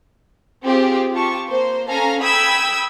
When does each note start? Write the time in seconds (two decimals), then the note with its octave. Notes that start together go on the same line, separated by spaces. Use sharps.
0.65 C4 F4 G4 G#4
1.12 F4 G4 A5 C#6
1.50 A#3 C5
1.88 C#4 A4 F5 G#5 A#5
2.22 G5 B5 D#6 E6 G#6